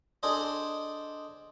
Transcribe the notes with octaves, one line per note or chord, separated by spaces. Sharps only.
D4 G#4 A4 C5 D#5